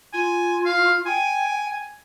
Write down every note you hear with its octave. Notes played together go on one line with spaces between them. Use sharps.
F4 G#5
F5
G5 G#5